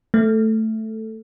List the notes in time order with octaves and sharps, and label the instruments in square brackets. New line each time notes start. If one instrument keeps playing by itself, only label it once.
[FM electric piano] A3